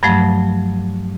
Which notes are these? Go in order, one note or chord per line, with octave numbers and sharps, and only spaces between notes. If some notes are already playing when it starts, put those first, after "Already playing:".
G2 F3 F#3 A3